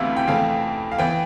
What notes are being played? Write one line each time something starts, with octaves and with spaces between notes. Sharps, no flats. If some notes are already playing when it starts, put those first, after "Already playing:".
Already playing: D2 C3 E3 B3 E4 F5
G5
F2 E3 A3 F5
F5
E3 B3 G5